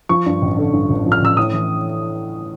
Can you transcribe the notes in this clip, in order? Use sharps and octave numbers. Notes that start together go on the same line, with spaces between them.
F3 C#6
G2
A1
D3
G2
A1
F3
F6
A1 E6
A2 D#6
E3